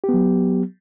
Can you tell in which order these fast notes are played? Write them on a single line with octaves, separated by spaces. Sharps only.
G4 B3 F#3